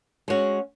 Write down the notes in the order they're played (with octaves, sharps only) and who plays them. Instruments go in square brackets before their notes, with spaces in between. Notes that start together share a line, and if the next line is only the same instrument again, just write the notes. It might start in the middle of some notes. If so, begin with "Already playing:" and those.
[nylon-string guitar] G#3 C#4 F#4